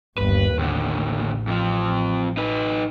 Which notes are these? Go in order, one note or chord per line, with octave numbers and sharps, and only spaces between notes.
G1 D#2 B4
A1 D#2 D3
F2 F3
D#4 B4